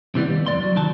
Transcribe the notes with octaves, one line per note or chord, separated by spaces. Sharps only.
C3 E3 G3 B3
D#2
F2 F3 D5 C6
F#3
C2 D#3 F#3 A5